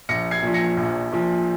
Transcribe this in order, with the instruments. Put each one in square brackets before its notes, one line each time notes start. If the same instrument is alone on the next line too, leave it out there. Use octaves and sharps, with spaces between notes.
[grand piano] A#1 A#6 C#7
G#6 C7
A#2 F3
A#6 C#7
A#1
A#2 F3